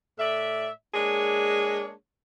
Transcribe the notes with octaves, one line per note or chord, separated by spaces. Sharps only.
A2 D5 E5
G#3 A#3 D4 G#4 C#5